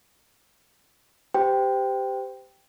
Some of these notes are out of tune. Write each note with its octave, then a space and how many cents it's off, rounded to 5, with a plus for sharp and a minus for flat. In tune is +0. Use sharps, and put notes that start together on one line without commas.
G4 +0 C5 -30 G5 +0